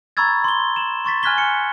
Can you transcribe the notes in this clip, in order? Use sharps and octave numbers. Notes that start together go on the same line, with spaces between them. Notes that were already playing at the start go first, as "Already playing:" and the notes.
A#5 B5 C#6 E6 G#6 A6
C6 G7
E7 F#7
C6 C#6 A6 B6
G#5 F6 F#6 G#6 B6 G7
C#7 G7